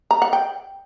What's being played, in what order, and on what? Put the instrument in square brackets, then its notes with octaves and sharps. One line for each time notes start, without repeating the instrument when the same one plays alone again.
[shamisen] A#5
F#5
G5